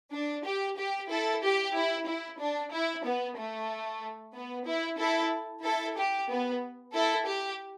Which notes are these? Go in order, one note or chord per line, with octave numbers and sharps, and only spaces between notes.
D4
G4
G4
E4 A4
G4
E4
E4
D4
E4
B3
A3
B3
E4
E4 A4
E4 A4
G4
B3
E4 A4
G4